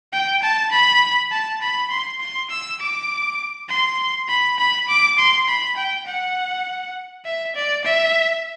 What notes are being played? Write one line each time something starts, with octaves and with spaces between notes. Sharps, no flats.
G5
A5
B5
A5
B5
C6
C6
E6
D6
C6
B5
B5
D6
C6
B5
G5
F#5
E5
D5
E5